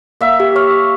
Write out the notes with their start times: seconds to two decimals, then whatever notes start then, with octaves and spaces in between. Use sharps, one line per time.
0.21 A#3 E5
0.40 G4
0.55 C#5 C#6 F6